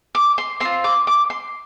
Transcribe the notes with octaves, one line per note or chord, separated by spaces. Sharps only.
D6
C6
C4 F4 C6
D6
D6
C6